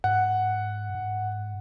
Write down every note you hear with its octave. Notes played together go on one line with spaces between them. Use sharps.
G#2 F#5
G#2